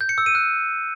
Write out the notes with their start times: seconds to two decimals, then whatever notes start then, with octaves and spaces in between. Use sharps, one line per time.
0.01 G6
0.09 C#7
0.18 E6
0.26 D#7
0.35 F#6